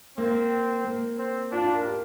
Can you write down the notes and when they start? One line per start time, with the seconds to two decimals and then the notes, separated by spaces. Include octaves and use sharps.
0.17 A#3 C4
0.85 A#3
1.18 C4
1.51 D4 F4
1.62 F4
1.74 A#4
1.85 G4